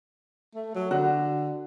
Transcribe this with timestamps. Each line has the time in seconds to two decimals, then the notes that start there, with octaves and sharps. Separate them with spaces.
0.55 A3
0.75 F#3
0.91 D3 F#4